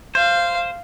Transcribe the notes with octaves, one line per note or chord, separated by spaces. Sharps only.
C5 F5